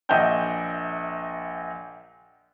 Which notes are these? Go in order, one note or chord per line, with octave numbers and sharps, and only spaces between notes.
A#1 D#5 E5 F#5 G5 G6